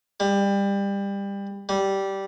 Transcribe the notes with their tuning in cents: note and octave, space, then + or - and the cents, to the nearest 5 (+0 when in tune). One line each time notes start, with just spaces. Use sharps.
G3 +25
G3 -10